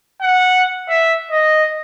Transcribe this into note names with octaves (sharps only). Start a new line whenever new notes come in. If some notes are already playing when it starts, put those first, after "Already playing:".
F#5
E5
D#5